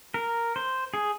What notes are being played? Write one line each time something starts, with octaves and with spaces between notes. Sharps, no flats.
A#4
C5
G#4